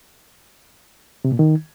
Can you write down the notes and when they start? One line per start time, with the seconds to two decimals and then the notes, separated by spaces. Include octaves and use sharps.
1.25 C3
1.32 A#2
1.39 D#3